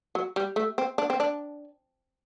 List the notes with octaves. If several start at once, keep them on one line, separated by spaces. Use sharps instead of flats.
F#3
G3
A3
C4
D4
C4
D4